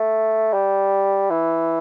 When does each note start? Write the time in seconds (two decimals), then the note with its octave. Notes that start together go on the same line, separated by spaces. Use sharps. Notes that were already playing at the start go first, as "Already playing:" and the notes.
Already playing: A3
0.53 G3
1.30 E3